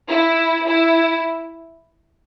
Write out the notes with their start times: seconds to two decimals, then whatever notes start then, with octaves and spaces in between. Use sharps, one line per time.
0.09 E4
0.67 E4